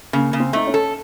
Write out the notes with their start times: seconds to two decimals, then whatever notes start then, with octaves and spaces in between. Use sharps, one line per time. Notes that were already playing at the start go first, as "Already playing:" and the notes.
0.13 C#3 A#3
0.33 C#3
0.40 C4
0.53 A3 D#4
0.67 C#4
0.74 A4